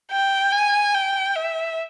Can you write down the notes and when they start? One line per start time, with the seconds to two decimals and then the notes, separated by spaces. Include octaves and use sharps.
0.11 G5
0.52 G#5
0.94 G5
1.35 E5